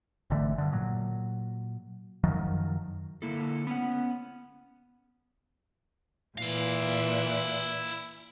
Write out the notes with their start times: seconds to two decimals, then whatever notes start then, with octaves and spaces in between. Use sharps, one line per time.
0.30 G#1 D3 E3 A3
0.58 G2 D3
0.72 A#2 F#3
2.24 F#2 D#3 F3 F#3
3.22 D3 A#3 E4 A4
3.67 B3 C#4 F#5
6.38 A#2 E3 E4 F5